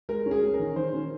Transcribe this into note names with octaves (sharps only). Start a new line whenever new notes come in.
G#3 A#4
C#4
G#4
C#4
A#4
D#3
D#3 C5
C#4